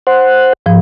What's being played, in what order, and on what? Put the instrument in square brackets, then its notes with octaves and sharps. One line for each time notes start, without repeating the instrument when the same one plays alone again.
[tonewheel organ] C5 F#5
[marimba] G#2 F3